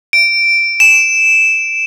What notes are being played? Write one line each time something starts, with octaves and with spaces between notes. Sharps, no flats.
D7
E7